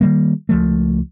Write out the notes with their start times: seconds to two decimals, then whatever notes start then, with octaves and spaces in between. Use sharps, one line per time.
0.01 D#3 F3 G3 A#3
0.49 C#2 F3 A3